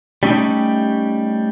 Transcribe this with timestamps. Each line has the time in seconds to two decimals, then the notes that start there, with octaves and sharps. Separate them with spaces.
0.23 G3 A3 C#4 D#4 G4